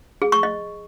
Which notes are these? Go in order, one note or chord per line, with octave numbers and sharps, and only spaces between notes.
G#4
C#6
D#5